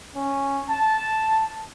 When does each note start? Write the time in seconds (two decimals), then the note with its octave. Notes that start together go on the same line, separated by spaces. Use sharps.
0.15 C#4
0.69 A5